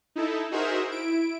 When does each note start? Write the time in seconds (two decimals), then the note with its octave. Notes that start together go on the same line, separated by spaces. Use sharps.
0.16 D#4 E4 A4
0.51 D#4 F#4 G#4 A#4 C5 E5
0.90 E4 D7